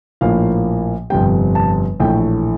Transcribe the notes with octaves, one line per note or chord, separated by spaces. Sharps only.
A#1 A2 F3 A#3 F5
G1 F2 C3 G3 G5
A5
A#1 A2 E3 A3 G5